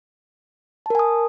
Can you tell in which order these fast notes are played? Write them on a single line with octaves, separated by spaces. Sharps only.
A5 A#4 G#5 D#6